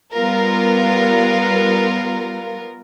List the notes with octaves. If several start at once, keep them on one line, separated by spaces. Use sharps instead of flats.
G3 B3 F4 A#4